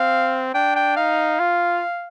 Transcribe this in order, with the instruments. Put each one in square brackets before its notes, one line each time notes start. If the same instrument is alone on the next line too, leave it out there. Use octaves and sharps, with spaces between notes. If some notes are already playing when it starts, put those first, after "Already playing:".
Already playing: [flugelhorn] C4 [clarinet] F5
[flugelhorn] D4 [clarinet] G5
[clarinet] G5
[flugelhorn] D#4 [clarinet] F5
[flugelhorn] F4